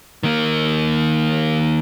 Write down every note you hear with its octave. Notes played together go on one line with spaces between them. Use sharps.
D#3 A#3